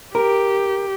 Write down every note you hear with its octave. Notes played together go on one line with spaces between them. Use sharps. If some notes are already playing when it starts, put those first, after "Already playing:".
G4 A#4